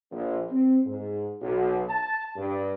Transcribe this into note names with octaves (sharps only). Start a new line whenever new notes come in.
A#1
C4
G#2
B1
A5
G2